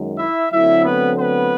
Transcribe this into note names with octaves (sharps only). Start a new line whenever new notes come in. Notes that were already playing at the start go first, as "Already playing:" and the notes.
Already playing: F#2 D#3 G#3
E4 E5
D3 F#3 A3 C4 E4 E5
B3 B4
B3 B4